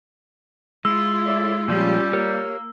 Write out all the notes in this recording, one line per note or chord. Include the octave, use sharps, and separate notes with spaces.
G#3 E4 F4 E6
A2 D5 E5
A#2 F3 G3 G#3 C#4 F4 G4
A#3 G4 A#4 C#5